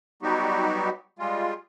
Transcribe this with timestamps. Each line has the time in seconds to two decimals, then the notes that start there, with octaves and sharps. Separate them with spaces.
0.22 F#3 G3 B3 D#4 F#4 G4
1.19 G3 G#3 F4